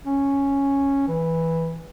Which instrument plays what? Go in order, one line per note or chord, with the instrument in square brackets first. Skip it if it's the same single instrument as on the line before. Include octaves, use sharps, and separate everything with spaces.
[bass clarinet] C#4
E3